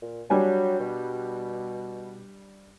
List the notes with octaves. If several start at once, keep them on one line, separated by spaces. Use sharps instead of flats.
A#2
F#3 G3 D4 G#5
B2